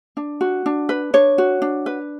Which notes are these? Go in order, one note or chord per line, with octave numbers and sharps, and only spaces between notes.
D4
F#4
D4
B4
D4 C#5
F#4
D4
B4